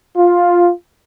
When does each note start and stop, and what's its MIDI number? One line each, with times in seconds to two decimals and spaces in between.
0.17 0.70 65